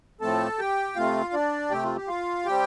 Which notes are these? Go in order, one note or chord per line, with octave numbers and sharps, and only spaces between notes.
A2 F3 A3 C4 A4 A5
G4 G5
C3 A3 C4 F4 F5
D4 D5
C3 A3 C4 G4 G5
F4
G4
F4 F5
G3 C4 G4 G5